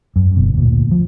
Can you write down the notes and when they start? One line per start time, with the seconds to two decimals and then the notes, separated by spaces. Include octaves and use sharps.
0.16 F#2
0.36 F#1 B2
0.54 D2 A#2
0.91 F3